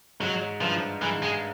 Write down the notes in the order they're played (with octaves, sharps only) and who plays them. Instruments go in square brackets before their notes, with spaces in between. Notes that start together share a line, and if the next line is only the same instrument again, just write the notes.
[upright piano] G#2 [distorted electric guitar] F#3
[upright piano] G2 [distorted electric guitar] F3
[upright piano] G#2 [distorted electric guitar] E3
[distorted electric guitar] G#3